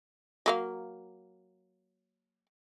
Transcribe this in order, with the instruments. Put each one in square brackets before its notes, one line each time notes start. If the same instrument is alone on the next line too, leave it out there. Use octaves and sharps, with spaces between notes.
[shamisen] F#3 A#3 F5